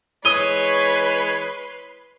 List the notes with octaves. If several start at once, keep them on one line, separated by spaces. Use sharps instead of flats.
E3 G#3 B4 C#5 C6 D#6 D#7 G7